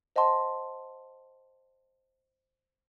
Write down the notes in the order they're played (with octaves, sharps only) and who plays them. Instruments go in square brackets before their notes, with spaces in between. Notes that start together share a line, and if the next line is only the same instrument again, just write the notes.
[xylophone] C5 D#5 F#5 A5 C6